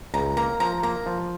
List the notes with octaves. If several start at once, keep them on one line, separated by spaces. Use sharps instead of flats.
C#2 A#5
A#3 A#5
F3 A#5
A#3 A#5
F3